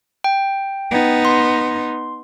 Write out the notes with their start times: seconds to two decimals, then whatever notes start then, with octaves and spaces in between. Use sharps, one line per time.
0.24 G5
0.92 B3 D#4
1.25 C6